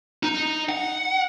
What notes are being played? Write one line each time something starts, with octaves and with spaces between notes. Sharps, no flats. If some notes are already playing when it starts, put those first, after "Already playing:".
D#4
F#5